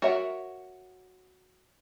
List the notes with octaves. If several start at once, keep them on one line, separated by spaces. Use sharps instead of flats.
F#4 A#4 C#5 E5 F#5